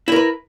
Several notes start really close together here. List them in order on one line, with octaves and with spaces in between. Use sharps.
E4 A#4 B4